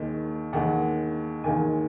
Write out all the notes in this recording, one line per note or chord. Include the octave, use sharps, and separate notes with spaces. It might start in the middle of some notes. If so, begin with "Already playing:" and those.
Already playing: D#2 D#3 G#3
D#2 D#3 G#3 F#5
D#2 D#3 G#3 G#5